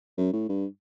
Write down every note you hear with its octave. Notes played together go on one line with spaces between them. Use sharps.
F#2
A2
G2